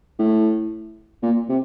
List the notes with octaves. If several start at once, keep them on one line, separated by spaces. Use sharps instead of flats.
A2
A#2
C3